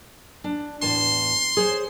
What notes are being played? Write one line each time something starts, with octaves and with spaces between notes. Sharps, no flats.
D4
E2 A2 A5 C6
G#4 C5 C#5